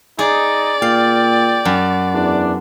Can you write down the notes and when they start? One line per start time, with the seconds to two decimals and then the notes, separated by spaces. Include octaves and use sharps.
0.19 D#4 G#4 D5
0.82 A#2 F5 G5
1.65 F#2
2.14 E2 D4